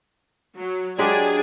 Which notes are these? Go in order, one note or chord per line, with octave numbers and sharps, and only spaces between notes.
F#3
F#3 G#3 D4 G4 G#4 G#5